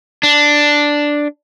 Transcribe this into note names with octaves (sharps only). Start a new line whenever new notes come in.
D4